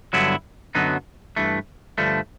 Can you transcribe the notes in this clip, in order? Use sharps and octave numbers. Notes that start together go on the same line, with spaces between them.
G2 D3 F#3 B3 E4
F#2 D3 F#3 B3 D#4
G2 E3 A3
G2 D3 F3 A3